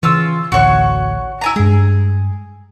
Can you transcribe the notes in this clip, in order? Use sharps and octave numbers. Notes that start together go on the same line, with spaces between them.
C#3 E3 C#4 F4 E6
A1 D2 F#4 C#5 C#6
E4 G#5 A#5
G2 G#3 G#4